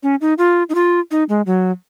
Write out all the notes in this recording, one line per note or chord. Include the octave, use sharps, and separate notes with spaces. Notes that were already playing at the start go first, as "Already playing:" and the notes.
C#4
D#4
F4
D#4
F4
D#4
G#3
F#3